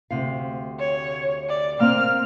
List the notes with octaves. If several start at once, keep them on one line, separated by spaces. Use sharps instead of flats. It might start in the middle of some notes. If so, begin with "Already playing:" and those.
D2 C3 F5
C#5
D5
A#3 C4 F6